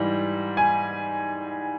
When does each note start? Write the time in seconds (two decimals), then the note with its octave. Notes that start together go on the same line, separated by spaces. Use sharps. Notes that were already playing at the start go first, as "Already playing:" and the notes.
Already playing: G#2 E3 G3
0.57 G#5